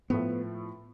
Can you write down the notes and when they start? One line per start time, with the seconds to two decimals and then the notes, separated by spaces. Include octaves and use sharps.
0.10 A2 F3 A3 B3